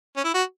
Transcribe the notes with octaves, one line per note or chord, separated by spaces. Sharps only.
C#4
E4
F#4